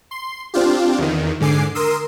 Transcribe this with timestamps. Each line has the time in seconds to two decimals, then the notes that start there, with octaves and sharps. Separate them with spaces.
0.11 C6
0.54 C4 D4 F4 G4
0.98 E2 D#3
1.40 G#2 D3 G#5 D6 C7
1.75 A#4 C6 D#6 E6